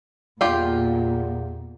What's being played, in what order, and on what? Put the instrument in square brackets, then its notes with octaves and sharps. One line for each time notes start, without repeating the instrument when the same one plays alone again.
[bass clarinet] E2 [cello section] A#2 [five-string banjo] F4 G4 F5